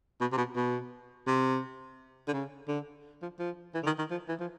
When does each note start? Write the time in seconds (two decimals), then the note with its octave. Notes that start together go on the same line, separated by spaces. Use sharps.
0.21 B2
0.32 C3
0.37 B2
0.56 B2
1.27 C3
2.28 D3
2.33 C#3
2.68 D3
3.22 F3
3.39 F3
3.74 E3
3.83 D3
3.86 D#3
3.99 D#3
4.11 F3
4.29 E3
4.40 F3